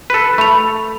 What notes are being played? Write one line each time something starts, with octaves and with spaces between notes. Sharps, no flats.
A4 B4
A3 B5 F7